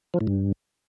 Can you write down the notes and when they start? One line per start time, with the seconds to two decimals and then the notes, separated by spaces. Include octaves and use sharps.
0.14 F3
0.21 A2
0.27 G2